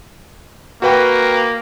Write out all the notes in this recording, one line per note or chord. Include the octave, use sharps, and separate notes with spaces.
A#3 F#4 B4 G5